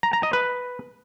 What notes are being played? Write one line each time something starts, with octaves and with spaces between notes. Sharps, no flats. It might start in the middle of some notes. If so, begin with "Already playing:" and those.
A#5
A#5
D#5
B4